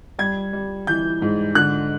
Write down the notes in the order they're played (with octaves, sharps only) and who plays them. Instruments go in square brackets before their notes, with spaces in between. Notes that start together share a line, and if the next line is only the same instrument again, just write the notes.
[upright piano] G3 G#6
G3
E3 G6
G#2
D3 F#6